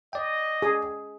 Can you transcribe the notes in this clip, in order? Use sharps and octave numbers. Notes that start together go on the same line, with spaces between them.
D5 D#5 G5
G#4